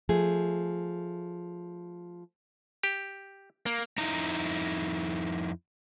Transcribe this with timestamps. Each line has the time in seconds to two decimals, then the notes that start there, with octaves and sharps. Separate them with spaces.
0.09 F3 A3 G#4
2.83 G4
3.66 A#3
3.98 F2 D#4 E4 A#5